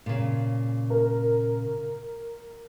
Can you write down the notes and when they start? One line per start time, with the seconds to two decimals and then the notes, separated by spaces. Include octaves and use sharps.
0.06 A#2 C#3
0.90 A#4